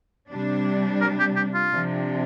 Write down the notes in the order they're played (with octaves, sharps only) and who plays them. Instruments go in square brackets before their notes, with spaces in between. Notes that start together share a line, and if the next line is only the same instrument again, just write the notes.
[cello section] C3 G3 D4
[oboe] A#4
G4
G4
F4
[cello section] C3 F3 D4